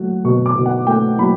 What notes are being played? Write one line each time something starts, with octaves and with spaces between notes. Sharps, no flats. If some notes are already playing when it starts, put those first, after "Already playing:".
Already playing: F#3 A3 F#5
B2 C#6
D6
B2
F#5
A3 G5
F#3 B5